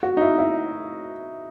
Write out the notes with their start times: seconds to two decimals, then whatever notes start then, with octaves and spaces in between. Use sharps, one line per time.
0.03 F#4
0.17 D#4
0.21 E4
0.38 E4